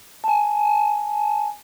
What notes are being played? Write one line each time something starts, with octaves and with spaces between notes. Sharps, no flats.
G#5 A5